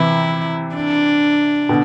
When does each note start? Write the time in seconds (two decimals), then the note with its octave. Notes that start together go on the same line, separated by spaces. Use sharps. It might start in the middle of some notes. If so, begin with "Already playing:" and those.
Already playing: C3 E3 E4
0.75 D4
1.69 B2 D3